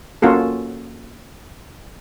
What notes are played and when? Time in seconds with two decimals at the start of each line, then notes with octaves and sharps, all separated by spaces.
0.22 A#3 C#4 F4 F#4 A4